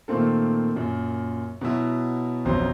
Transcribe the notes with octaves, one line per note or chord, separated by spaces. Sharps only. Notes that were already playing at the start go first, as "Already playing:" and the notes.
A#2 D#3 A3 A#3 C4 A4
F#2 A#2
B2 F#3 E4
D1 A1 F2 B2 F#3 C5